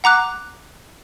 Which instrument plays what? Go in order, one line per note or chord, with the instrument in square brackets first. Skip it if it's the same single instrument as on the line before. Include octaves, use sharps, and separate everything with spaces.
[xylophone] F#5 A#5 D6 F#6